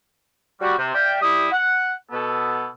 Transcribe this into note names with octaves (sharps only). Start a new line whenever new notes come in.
G3 F#4
C3
D5 E5 F5 G5
G3 E4 G4 D#6
F#5
B2 B3 A4